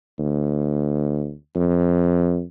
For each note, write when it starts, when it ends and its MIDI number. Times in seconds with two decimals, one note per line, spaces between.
0.19 1.34 38
1.55 2.44 41